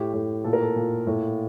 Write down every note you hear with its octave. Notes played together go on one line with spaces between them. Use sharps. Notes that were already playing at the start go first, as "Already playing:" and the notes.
Already playing: A2 G4
A2 G4
A#2 A4
A#4
A4
A#2
A2